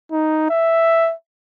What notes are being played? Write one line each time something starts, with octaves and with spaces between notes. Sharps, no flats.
D#4
E5